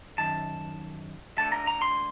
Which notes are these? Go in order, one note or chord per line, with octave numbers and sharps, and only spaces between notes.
F#2 D#3 A5
D2 D3 A3 A5
A#5
A#5
C6